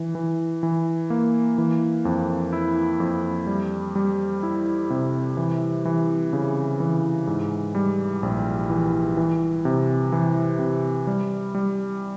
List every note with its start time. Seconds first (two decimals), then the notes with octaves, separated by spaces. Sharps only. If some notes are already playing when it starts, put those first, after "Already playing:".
Already playing: E3
0.15 E3
0.63 E3
1.10 A#3
1.58 E3
2.05 F2
2.53 E4
3.00 F2
3.47 G3
3.95 G3
4.43 E4
4.90 C3
5.37 E3
5.85 E3
6.33 C#3
6.80 E3
7.27 G#2
7.75 G3
8.23 A#1
8.70 E3
9.17 E3
9.65 C3
10.12 E3
10.59 C3
11.07 G3
11.55 G3